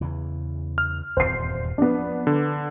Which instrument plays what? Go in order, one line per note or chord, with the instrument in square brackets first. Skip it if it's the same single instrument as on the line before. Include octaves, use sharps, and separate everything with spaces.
[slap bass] E2 C#3 E3
[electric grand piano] F6
[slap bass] D#1 E2 G2 [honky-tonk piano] C5 C7
[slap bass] F3 [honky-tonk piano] B3 D4
[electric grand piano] D3